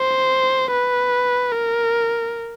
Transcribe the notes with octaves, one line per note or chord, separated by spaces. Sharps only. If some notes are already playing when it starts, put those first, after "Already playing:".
Already playing: C5
B4
A#4